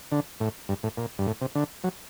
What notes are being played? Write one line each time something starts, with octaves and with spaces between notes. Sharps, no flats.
D3
A2
G2
A2
A#2
G2
A2
C3
D3
F#3